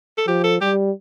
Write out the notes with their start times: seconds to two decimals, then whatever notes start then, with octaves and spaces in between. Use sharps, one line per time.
0.18 A4
0.27 F3 G4
0.44 A4
0.61 G3 G4